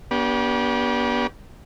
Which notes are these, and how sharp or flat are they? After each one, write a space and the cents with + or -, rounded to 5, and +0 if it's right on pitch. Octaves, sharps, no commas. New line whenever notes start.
B3 -35 D4 -35 G4 +0